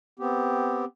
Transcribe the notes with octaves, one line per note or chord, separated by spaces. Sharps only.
B3 C4 G4